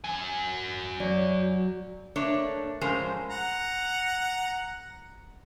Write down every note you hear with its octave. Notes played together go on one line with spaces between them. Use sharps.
F#4 G#5
F#3 D5
A3 A#3 D4 C#5 D5
A2 F3 G#3 C#4 A#4 C5
F#5 A#5